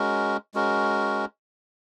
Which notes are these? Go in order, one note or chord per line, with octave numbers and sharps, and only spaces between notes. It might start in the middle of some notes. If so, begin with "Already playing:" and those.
Already playing: G#3 C#4 F#4 A#4
G#3 C#4 F#4 A#4